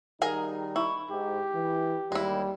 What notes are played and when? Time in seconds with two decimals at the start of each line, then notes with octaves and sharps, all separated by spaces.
0.22 D#3 G3 D#4 G#4 A#4 G#5
0.76 E4 C#6
1.11 G#2 G4
1.55 E3
2.12 D#2 G3 G#3 E4